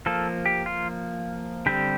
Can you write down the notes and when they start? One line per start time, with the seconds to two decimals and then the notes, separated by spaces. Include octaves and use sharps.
0.06 F3 A#3 A4
0.46 G4
0.66 F4
1.66 D3 G3 C4 G4